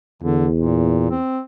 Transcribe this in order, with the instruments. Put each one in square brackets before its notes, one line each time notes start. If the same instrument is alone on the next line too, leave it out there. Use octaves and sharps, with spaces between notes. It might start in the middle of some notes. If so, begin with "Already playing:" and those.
[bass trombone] E2 [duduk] D3
[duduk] A#2
C4